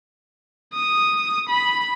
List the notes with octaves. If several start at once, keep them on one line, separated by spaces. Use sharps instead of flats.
D#6
B5